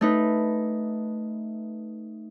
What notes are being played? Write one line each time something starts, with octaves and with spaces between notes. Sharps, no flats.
A3 D#4 B4